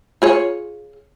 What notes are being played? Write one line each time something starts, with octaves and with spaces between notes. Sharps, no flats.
F4 G#4 C#5